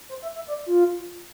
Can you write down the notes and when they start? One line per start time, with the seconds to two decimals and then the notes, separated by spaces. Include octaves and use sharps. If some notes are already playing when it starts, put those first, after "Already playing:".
0.09 C5
0.22 E5
0.35 E5
0.48 D5
0.66 F4